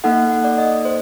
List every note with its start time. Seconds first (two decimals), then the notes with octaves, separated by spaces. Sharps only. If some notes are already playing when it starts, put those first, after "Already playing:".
0.04 A#3 D#4 A4 F#5
0.31 F#5
0.44 D5
0.58 D#5
0.85 C5